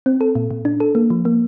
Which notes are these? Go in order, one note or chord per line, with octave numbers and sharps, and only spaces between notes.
C4
A4
A#2
A#2
D4
A4
A#3
F3
A#3